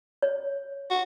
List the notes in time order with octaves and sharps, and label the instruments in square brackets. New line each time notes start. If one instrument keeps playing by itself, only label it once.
[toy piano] C#5
[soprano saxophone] F#4